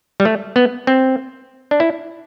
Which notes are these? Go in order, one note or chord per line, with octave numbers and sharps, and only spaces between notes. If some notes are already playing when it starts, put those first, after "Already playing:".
G3
A3
B3
C4
D4
E4